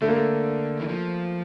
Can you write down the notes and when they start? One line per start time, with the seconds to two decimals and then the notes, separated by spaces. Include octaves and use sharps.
0.02 D3 A3
0.09 A#3
0.16 A3
0.79 E3
0.88 F3